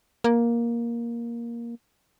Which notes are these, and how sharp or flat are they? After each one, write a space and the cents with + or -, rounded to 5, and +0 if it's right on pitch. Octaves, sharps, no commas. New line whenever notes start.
A#3 +10